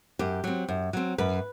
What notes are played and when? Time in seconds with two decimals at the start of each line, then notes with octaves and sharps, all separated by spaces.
0.19 F#2 G4
0.44 F#3 C4
0.68 F#2
0.93 F#3 C4
1.18 F#2 B4